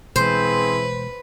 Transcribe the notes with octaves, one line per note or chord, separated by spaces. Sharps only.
B2 E3 G#3 C4 E4 G#4 B4 C5